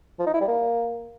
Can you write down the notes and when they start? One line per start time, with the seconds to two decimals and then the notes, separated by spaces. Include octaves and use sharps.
0.19 F3
0.26 D#4
0.34 E4
0.41 G3
0.48 A#3